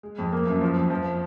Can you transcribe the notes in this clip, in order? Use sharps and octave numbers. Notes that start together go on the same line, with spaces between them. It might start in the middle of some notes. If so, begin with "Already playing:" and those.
G#3
F2
A#3
F#2
F3
F2
F3